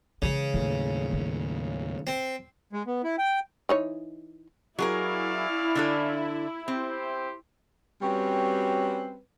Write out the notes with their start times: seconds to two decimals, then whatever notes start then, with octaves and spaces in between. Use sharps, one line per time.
0.22 C#3 E3 G#3
0.54 D#2 A2 E3
1.13 D#3
2.07 C4
2.73 G#3
2.87 B3
3.04 E4
3.18 G5
3.69 E3 D#4 C#5
4.79 F#3 C#4 E4 G#4 A#4 D5 F5
5.75 D3 D4 A4
6.68 C4 G4 C5
8.02 G3 C4 C#4 F#4 B4 C#5